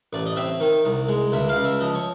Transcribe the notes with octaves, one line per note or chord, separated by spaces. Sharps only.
A1 D5
D#5
C4 E5
D#3
C2
G#3
C#2 E5
F5
C#2
E5
F3 D#5
C#5